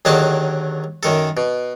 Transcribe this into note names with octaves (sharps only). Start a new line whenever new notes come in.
D#2 D3 D#3 F#3 G#4 A5
F#2 D#3 A4
B2